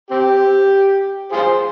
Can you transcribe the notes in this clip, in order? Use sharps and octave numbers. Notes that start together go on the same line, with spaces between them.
C4 G4
F4 G#4 C5